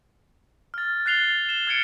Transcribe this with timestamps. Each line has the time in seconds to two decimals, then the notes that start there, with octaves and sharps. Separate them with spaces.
0.74 F6 A6
1.06 F#6 A6 C7 F7 G7
1.49 E7 G7
1.67 F6 G#6 A6 C#7 D7